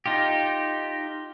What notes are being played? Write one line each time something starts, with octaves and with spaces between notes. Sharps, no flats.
D#4 F4 G4